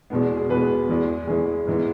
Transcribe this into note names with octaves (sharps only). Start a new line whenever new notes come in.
E2 B2 G#3 B3
G#4
E2 B2 G#3 B3 B4
E2 E3 G#3
E2 E3 G#3 G#4
G#2 E3 G#3 B3